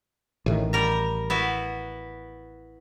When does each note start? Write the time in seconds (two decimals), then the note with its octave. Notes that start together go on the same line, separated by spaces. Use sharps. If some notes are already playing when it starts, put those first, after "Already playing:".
0.46 A1 A2 D#3
0.73 G3 A#4 A#5
1.30 B3 E4 F#4